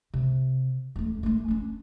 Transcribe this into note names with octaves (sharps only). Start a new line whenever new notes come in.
C3
D#1 A3
A#1 A3
C#4 D4